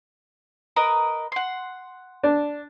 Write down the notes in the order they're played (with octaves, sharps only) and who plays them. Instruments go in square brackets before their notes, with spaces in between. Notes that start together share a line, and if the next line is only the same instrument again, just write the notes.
[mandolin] A#4 B4 D#5
F#5 C6
[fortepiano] D4